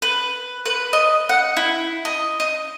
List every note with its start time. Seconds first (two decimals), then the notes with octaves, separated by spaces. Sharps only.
0.02 B4
0.66 B4
0.93 D#5
1.29 F#5
1.57 E4
2.05 D#5
2.40 D#5